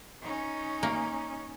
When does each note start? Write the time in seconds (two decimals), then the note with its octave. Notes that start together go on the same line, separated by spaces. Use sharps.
0.22 C#4 D#4
0.83 A#3